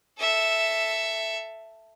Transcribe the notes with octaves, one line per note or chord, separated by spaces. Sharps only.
A4 E5